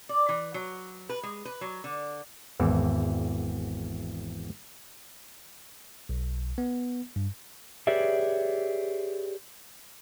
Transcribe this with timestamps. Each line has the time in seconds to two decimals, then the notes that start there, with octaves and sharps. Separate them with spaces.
0.09 D5
0.29 E3
0.54 F#3
1.09 B4
1.23 G#3
1.45 B4
1.61 F#3
1.84 D3
2.60 G#1 E2 E3
6.09 B1
6.58 B3
7.16 G2
7.87 G4 G#4 B4 C#5 D5 E5